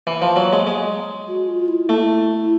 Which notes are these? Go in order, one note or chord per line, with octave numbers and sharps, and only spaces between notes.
E3
F3
F#3
G#3
G#3
F#4
F4
E4
A3 E4